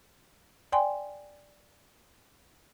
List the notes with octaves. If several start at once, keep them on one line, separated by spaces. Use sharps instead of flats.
D5 G5 G#5 C6